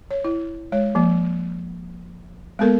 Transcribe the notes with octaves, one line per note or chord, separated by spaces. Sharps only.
C#5
E4
G#3 C#5
F3 A#3
G#3 A#3 B3 A4 A#4